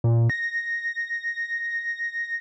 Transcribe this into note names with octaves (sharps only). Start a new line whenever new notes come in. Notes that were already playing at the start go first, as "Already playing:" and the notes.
A#2
A#6